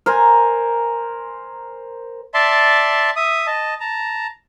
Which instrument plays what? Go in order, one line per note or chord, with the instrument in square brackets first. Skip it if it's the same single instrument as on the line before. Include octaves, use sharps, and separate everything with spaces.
[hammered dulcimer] A#4 C5 G#5
[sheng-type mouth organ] D5 E5 A5 C6
E5 D#6
D#5 A5
A5 A#5